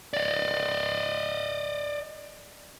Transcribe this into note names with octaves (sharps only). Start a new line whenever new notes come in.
D5 D#5